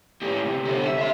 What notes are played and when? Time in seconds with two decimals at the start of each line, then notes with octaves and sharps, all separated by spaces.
0.22 A2 G4
0.46 C3
0.66 D3 G4
0.85 E5
0.98 E5 C6